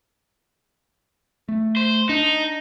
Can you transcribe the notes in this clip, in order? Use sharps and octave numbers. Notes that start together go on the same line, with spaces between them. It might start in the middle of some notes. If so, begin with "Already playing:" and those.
A3
C5
D4 D#4